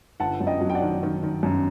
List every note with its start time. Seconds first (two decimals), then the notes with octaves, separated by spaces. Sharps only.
0.20 G1 F#5 A5
0.40 F#2
0.47 D#5 G5
0.61 F#3
0.70 G5
0.74 D5 F#5
0.82 D#3
1.03 D#3
1.23 D#3
1.43 F#2